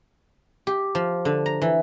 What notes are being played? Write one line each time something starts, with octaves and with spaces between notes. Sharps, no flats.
G4
F3
D3
A#5
E3